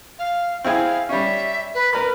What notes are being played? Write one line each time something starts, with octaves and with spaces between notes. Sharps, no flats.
F5
C4 E4 G#4 F5
G3 C#4 E5
B4
A#4 B4 B5